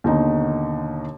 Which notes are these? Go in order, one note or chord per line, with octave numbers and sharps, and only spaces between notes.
D#2 B2 D3 D#3 D#4